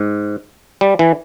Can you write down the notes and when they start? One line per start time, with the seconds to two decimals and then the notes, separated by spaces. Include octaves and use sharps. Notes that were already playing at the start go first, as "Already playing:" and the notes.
Already playing: G#2
0.81 G3
0.99 E3